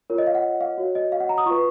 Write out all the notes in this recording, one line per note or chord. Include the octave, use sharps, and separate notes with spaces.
F4 A#4 C#5
D#5
F5
F#5
F5
F#4 C#5
D#5
F5
F#5
A#5
D#6
F4 B4 C#6